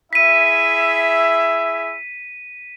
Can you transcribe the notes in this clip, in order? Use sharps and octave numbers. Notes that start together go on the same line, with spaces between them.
E4 G#4 E5 B6 D#7